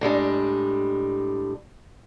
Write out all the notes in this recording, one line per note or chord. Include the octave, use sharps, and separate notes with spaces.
A2 G3 G#3 D4